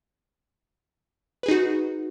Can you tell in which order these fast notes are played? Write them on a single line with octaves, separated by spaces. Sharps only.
B4 G#4 D#4 F#4